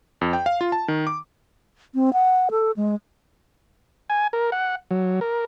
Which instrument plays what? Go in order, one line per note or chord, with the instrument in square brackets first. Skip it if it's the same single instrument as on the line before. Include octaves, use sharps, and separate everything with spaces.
[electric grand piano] F2
G5
F5
F4
A5
D#3
D6
[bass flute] C4
F#5
A4
G#3
[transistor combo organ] G#5
A#4
F#5
F#3
A#4